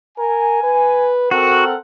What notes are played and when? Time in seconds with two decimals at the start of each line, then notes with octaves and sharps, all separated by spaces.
0.18 A#4 G#5
0.63 B4
1.31 C4 F#4 A4 A#4 F#5